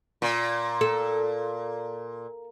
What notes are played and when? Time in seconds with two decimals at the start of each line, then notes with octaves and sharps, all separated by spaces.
0.22 A#2
0.81 A4